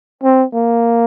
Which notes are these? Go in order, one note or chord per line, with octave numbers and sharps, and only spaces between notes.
C4
A#3